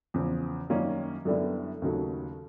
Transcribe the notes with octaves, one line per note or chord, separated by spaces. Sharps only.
E2 C#3 F3
F#2 D#3 G3 A#3 C#4
F#2 D3 G3 B3 E4
D#2 C#3 F#3 A3